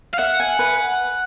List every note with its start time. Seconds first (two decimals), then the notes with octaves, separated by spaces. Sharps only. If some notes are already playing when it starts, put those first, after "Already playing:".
0.14 F5
0.19 E5 F#5
0.40 G#5
0.59 B4